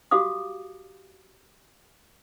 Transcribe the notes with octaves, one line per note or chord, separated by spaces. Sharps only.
F#4 G4 F5 D6 D#6